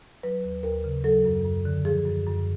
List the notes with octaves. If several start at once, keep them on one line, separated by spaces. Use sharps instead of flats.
F#3 B4
D#2
D#2 A#4
C#3
F#3 A4
F#2
F#2
D3
F3 G#4
F#2
F#2